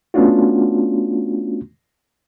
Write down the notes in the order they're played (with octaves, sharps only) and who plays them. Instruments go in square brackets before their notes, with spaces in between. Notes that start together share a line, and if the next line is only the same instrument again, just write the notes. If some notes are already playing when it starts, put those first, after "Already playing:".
[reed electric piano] A3 B3 C#4 D4 F4 F#4